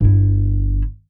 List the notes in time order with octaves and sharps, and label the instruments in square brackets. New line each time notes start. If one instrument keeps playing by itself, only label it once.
[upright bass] G1 E4